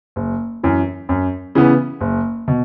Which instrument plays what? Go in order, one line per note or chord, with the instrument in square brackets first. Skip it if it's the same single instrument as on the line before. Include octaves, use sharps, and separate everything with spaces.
[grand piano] F#1
F#2 E3
F#2
C#3 E3 B3
F#1
B2